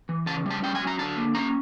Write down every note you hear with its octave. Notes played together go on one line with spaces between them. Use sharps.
E3
C#3 A5
G3 A5
C#4 G5
G#5
F#3
A#5
D3 A5
A#3
C#4 A#5